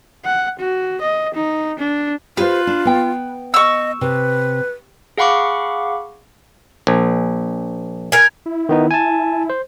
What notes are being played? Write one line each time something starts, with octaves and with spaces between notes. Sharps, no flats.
F#5
F#4
D#5
D#4
D4
F4 G4 B4 C5
D4
B3 G5
D#5 C#6 E6
C3 B4
G#4 F5 F#5 B5 C#6 D6
A#1
A#4 G#5
E4
D#3 B3 D#4
G#5 A5
C5